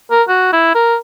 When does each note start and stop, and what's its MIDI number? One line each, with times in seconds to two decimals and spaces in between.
0.11 0.23 70
0.28 0.50 66
0.53 0.70 64
0.75 0.97 70